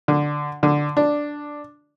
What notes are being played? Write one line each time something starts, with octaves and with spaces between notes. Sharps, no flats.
D3
D3
D4